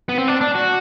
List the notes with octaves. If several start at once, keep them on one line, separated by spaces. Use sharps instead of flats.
B3
C4
D4
D4
F#4